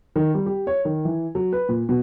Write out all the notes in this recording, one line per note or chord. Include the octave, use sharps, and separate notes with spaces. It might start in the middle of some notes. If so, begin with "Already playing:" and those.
D#3
G3
G4
C#5
D#3
E3
F#3
B4
A#2
B2